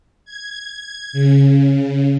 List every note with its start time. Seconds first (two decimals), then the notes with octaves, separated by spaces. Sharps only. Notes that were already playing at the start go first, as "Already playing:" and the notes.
0.25 G#6
1.13 C#3